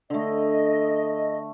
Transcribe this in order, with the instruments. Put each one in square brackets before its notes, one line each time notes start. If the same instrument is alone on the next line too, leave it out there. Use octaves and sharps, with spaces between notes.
[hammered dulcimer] D3 A3 [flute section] D#5